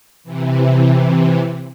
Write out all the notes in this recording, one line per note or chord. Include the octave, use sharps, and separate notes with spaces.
C3 E3